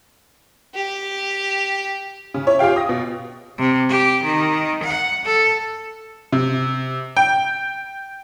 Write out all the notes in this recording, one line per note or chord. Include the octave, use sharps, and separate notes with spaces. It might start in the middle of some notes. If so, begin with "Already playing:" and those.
G4
C#3
E4 C#5
F4 G4 G#4 F5 G5
D#6 A#6
B2
C3
G4
D#3
F#5
A4
C3
G5